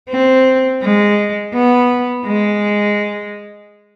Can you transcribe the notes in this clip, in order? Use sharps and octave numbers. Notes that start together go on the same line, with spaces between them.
C4
G#3
B3
G#3